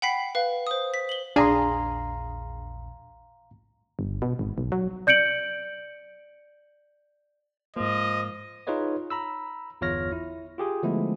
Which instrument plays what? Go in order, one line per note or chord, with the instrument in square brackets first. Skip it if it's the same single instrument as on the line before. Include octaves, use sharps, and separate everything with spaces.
[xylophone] F#5 G5 B5 B6 C7
B4 F5
C5 D#6
B6
F#7 G7
[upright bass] A#1 E2 [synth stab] D4 G#4 [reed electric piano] F5 A#5 C6
[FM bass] G1
B2
G#1
B1
F#3
[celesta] D5 G6 C#7 D7 F#7
[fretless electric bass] G#2 A#3 [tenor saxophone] F3 [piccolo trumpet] D#5
[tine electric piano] D#4 F4 G#4 B4 C#5 D#5
A#5 B5 E6
G1 E2 F4 C#5 F6 A#6
E4
F4 G4 G#4
D3 F3 G#3 A3 B3 E4